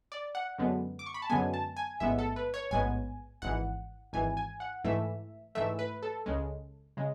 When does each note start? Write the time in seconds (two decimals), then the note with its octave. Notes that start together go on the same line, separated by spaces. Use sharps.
0.12 D5
0.35 F#5
0.58 F#2 D3 G#3 B3
0.99 D6
1.06 C#6
1.14 B5
1.22 A5
1.30 F#2 D3 G#3 B3 G#5
1.54 A5
1.77 G#5
2.00 A1 G#2 G#3 B3 E5
2.19 A4
2.36 B4
2.54 C#5
2.71 A1 G#2 G#3 B3 G#5
3.42 G#1 G#2 E3 F#5
4.13 G#1 G#2 E3 G#5
4.37 G#5
4.60 F#5
4.84 G#2 E3 A3 E5
5.55 G#2 E3 A3 E5
5.79 B4
6.03 A4
6.26 C#2 C#3 G#3
6.97 C#3 G#3